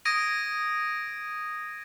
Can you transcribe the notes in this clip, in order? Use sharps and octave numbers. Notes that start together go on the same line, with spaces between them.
D#6 G#6 A#6 D7 D#7